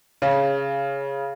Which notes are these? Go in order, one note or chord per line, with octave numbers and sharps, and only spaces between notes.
C#3